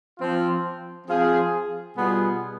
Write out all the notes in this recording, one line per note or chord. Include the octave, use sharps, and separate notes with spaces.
F3 C4 F4
F3 C4 F4 G#4
B2 G3 B3 F4 G#4